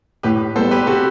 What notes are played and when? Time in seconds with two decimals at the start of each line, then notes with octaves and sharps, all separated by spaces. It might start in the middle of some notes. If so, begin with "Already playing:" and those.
0.23 A2 G4 B4
0.55 G3 B3 A4 C5
0.71 G4 B4
0.87 C3 F#4 A4